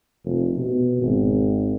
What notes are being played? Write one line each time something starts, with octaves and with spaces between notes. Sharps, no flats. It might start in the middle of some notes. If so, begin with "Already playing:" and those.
F1
B2
G#1